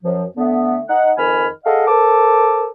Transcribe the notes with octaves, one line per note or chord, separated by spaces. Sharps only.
F#2 F3
D3 A3 B3
D#4 F#5
F2 D#3 G#5 B5 F6
G#4 A4 D#5 F5 F#5
A4 A#4 C5 D6